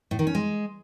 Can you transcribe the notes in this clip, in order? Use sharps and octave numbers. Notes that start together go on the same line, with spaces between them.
A2
D#3
C#4
G#3